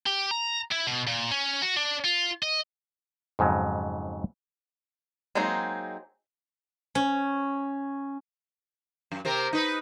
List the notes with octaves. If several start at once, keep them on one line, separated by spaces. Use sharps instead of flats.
G4
A#5
E4
B2
A#2
C#4
F#4
D4
F4
D#5
F2 G#2 C#3 F#3
F#3 G#3 A#3 C4 D#4
C#4
F#2
C3 C4 A#4
D#4 B4